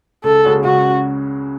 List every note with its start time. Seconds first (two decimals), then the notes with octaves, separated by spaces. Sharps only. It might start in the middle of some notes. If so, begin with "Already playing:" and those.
0.24 C#2 A4
0.44 C#3 G#3 C#4 F#4
0.64 C#2 F#4